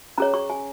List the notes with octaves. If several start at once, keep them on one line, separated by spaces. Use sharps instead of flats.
C#4 G#4 C#5 A#5
C#6
G#5